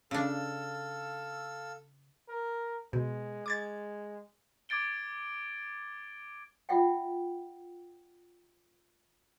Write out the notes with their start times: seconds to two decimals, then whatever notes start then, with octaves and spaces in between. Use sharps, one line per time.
0.11 C#3 D4 A4 F5 E6
2.29 A#4
2.93 B2 G#3
3.46 G#3 D6 G#6 A6
4.69 D6 G#6 A6 D7 G7
6.69 F4 E5 F#5 G5